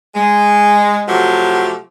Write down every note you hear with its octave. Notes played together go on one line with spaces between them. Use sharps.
G#3
C3 F3 F#3 A3 F#4 G4